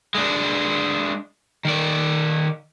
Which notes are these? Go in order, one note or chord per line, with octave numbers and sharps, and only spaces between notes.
G#3 D4
D#3 D5